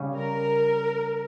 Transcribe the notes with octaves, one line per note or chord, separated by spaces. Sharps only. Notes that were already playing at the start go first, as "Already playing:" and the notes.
Already playing: C#3 G3 C#4
A#4